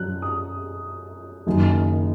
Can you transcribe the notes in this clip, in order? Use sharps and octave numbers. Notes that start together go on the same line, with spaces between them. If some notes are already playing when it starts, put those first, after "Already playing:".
Already playing: F#2 F#3 C#4 F#6
D#6
F#1 F#2 D#3